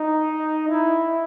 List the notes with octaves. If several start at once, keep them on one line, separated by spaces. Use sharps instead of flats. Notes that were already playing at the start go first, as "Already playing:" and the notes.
Already playing: D#4
E4